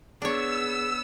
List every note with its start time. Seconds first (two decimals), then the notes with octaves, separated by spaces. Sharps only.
0.22 B3 D4 G#4 C#5 E6